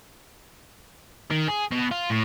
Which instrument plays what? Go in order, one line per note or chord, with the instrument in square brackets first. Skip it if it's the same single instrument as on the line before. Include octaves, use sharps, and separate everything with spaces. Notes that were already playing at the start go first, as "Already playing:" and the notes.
[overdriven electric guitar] D#3
G#4
B2
F4
A2